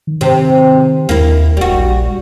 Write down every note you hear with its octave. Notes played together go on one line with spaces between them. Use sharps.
D#3
C3
D#2 A#3 E4
D1 G3 F#4
A#1